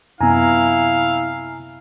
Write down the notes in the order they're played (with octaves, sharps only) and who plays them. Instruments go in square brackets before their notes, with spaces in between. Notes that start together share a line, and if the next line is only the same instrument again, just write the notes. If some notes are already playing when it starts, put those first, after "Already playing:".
[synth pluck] F#2 C3 B3 [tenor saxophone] E4 [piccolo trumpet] F5 [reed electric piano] G#5 A#5